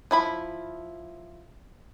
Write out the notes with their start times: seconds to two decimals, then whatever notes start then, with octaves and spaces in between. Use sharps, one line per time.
0.11 F3 E4 B5